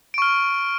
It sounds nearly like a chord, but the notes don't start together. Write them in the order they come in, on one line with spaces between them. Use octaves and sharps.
D7 C#6 F6